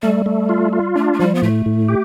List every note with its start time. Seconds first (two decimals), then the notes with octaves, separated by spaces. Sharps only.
0.02 G3 A3
0.26 A3
0.49 F4
0.73 F4
0.96 A3 D4
1.13 A3
1.19 F3 G3
1.35 B3
1.42 A2 A3
1.66 A2
1.89 G4